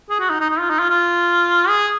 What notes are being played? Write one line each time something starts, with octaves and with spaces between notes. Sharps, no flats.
G#4
F#4
D#4
D#4
D#4
F4
D#4
F4
F4
G#4